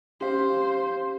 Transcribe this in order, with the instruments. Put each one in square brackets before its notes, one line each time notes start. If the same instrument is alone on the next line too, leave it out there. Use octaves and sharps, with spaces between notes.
[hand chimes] C#4 F5 [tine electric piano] G4 [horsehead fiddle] C5